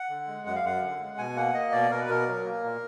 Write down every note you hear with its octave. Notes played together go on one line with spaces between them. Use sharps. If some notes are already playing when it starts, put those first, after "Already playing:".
Already playing: F#5
D3
G#3
F#2 F#5
F5
F#2 F#5
D3
G#3
B2 G#5
A#3 F#5
A#3 D#5
B2 D5
B2 A#4
B4
B2 A#4
F#3
A#3
A#2